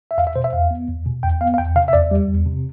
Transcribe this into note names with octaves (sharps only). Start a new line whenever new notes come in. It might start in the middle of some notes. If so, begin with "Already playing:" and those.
E5
E2 F5
E5
B2 C5
E5
E2 F5
B3
E2
B2
E2 G5
B3 F5
F5
E2 G5
C3 F5
E5
E2 D5
G3
E2
C3